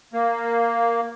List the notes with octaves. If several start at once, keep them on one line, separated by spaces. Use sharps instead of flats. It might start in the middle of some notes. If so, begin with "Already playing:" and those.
A#3